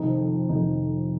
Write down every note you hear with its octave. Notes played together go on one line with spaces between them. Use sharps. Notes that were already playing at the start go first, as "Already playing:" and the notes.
Already playing: F1 F2 D#3 D#4
F1 F2 D#3 D#4